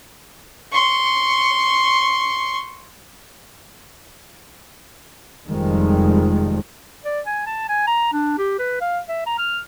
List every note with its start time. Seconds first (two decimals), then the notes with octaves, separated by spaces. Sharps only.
0.72 C6 C#6
5.48 F1 F2 D#3 F3 G3 G#3
7.05 D5
7.26 G#5
7.46 A5
7.69 G#5
7.87 A#5
8.13 D4
8.38 G4
8.59 B4
8.81 F5
9.09 E5
9.26 A#5
9.38 F6